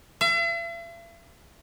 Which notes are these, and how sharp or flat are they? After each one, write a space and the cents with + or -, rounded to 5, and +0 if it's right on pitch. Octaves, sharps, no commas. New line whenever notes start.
E5 +45